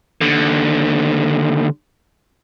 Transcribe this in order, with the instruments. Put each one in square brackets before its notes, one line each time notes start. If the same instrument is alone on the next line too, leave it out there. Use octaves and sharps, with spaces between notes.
[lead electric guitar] D#2 D3